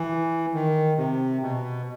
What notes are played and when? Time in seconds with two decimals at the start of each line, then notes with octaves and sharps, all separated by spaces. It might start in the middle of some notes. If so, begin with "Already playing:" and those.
Already playing: E3
0.54 D#3
0.98 C3
1.42 B2